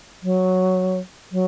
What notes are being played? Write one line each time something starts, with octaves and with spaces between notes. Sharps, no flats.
F#3
F#3